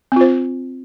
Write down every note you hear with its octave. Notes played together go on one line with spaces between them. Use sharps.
C4 F4 C5